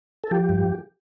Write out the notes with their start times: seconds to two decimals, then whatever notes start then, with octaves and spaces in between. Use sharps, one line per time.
0.24 A4
0.31 F3 G4
0.49 G2